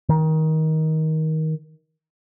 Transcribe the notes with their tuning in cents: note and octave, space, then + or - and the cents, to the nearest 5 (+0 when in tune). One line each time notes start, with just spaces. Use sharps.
D#3 +20